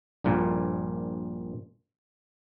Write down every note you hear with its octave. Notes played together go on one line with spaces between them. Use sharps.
A#1 G2 A#2